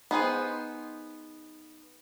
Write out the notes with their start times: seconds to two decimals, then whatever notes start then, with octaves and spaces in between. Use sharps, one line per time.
0.11 B3 D#4 G#4 C5